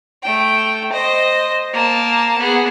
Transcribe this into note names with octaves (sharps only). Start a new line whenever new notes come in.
A3 G5
C5 D#5
A#3 A5
B3 G#4